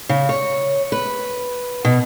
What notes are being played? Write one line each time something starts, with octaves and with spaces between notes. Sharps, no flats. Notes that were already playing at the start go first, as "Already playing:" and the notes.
C#3
C#5
B4
B2